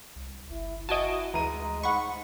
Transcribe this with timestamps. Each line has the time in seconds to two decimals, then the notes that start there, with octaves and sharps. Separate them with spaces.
0.16 C2
0.50 F#1 E4
0.89 E4 F#4 D#5 G#5 A5 D7
1.34 D2 E3 G#3 A#5 D#7
1.83 G#2 F#5 B5 C#6